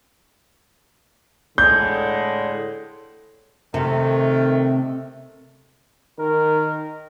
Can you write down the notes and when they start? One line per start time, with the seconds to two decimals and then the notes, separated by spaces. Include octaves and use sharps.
1.58 A2 D3 G#3 G6
3.74 C3 D#3 A3
6.19 D#3 A#4